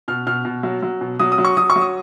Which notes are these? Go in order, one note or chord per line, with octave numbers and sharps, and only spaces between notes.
B2 F6
B2 F6
B2
F#3
F#3
B2
F#3 D#6
D#6
F#3
C#6
F#3 D#6
C#6
F#3
D#6